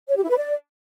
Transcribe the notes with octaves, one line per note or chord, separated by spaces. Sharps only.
C#5
G4
E4
B4
D5